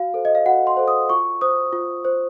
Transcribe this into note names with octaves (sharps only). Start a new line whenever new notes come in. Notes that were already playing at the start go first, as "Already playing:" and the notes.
Already playing: F#4 F5
A4 C5
D#5
F5
F#4 F#5
C6
A4 C5
D#6
F4 C#6
C5 D#6
F4
C5